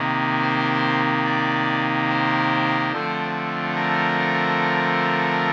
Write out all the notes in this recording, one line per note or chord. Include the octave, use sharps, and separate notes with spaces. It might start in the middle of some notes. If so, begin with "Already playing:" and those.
Already playing: C3 D#3 A#3
C5
D5
C5
D3 F3 A3 C4
A#4